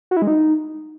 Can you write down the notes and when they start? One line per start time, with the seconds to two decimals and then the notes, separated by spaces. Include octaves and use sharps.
0.11 F#4
0.17 E4
0.22 G#3
0.27 D#4